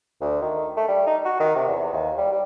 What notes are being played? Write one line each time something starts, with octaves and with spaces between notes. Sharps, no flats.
D2
D#3
A3
G3
D#4
F#4
D#3
C3
E2
D#2
G3
G3